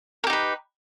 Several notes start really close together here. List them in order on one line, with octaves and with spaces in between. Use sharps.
A#4 G4 D#4 B4